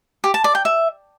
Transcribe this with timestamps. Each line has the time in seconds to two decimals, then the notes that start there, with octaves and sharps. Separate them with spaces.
0.24 G4
0.34 A5
0.44 D5
0.55 G5
0.65 E5